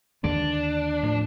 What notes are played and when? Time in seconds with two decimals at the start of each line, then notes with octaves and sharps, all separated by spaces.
0.24 D#2 D3 G#3 D4
1.03 A2 F3